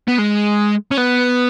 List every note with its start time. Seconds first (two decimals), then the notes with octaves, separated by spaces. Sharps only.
0.08 B3
0.19 G#3
0.91 C#4
0.97 B3